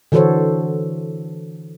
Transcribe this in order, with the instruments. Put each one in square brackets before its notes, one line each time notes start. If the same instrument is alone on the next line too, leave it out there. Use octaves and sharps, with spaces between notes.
[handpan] D3 E3 F#4 A4 C5 C#5